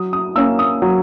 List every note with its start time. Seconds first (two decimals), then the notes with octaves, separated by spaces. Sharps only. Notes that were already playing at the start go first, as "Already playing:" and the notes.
Already playing: F#3 D#6
0.13 D#6
0.36 A#3 C#4 E6
0.59 D#6
0.82 F#3